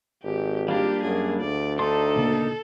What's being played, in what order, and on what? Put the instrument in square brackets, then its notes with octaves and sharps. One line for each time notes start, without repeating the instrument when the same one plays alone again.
[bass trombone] G#1 [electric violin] G4
[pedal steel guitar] G3 A#3 D4 [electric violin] F4 G4 [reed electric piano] F5
[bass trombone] F#2 [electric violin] G#4
[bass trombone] D2 [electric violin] D5
[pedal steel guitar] D4 D#4 [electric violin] A4 [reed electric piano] C6
[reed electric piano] A#2 C#3 A#3